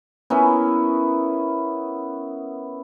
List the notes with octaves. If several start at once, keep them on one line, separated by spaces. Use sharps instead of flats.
B3 C#4 E4 A#4